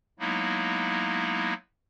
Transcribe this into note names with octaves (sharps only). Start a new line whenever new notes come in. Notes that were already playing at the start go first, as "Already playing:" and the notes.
F#3 G#3 A#3 B3 D#4 E4